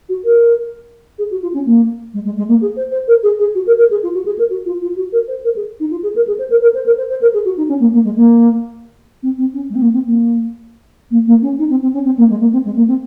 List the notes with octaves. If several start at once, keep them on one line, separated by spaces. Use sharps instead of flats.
F#4
A#4
G#4
F#4
F4
C#4
A#3
G#3
G#3
G#3
A#3
G#4
C5
C5
A#4
G#4
G#4
F#4
A#4
A#4
G#4
F4
F#4
G#4
A#4
F#4
F4
F4
F#4
A#4
C5
A#4
G#4
D#4
F4
G#4
A#4
G#4
C5
A#4
A#4
C5
A#4
C5
C5
A#4
G#4
F#4
D#4
C#4
A#3
A#3
G#3
A#3
C4
C4
C#4
G#3
C4
A#3
C4
A#3
A#3
A#3
C#4
D#4
C4
C4
C#4
C4
A#3
G#3
A#3
C4
G#3
A#3
C4